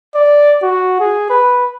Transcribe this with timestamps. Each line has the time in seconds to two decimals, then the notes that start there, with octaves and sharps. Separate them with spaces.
0.15 D5
0.63 F#4
1.00 G#4
1.30 B4